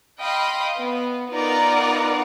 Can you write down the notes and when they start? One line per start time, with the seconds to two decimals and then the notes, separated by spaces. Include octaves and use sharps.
0.22 D#5 F5 G5 B5 C6
0.79 B3
1.31 B3 D#4 F4 A#4 D5 F#5